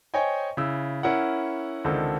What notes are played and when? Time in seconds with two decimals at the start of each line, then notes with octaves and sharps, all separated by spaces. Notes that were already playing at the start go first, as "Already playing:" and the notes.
0.14 C5 C#5 D#5 G5 G#5
0.57 C#3 E4 E6
1.03 C#4 E4 A#4 F#5
1.85 C#2 D3 D#3 C4 A4